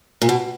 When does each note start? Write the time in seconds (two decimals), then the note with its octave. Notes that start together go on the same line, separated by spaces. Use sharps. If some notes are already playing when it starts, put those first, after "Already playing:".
0.22 A#2
0.29 B2